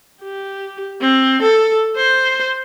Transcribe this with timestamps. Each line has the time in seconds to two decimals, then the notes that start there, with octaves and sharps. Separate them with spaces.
0.23 G4
1.01 C4
1.42 A4
1.96 C5